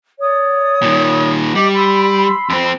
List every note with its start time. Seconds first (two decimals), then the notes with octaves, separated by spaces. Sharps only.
0.19 C#5 D5 D#6
0.82 A#2 D#3
1.55 G3 D#5 D6
1.74 B5 C6 E6
2.50 F2 C4